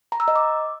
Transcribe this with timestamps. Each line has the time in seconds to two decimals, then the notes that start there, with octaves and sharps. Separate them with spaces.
0.12 A#5
0.20 E6
0.28 D#5
0.35 D6